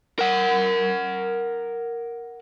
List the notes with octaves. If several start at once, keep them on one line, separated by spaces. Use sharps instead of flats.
A#4 F#5